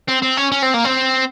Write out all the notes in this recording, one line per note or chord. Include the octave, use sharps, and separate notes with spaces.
C4
C4
C#4
C#4
C4
A#3
C4